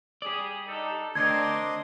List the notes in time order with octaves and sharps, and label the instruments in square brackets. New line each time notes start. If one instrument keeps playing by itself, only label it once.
[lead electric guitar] G4 D5 [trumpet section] G#4 D#6
[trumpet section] D4 D#4 A4
[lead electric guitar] D2 [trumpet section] C4 A#4 D6 [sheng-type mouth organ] D4 D#5 C6 [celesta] G#6